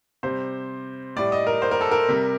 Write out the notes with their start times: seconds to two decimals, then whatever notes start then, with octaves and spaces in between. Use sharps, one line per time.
0.23 C3 G3 C5
1.16 A2 G3 D5
1.32 D#5
1.47 A#4
1.62 C5
1.71 A#4
1.81 A4
1.91 A#4
2.08 C3 G3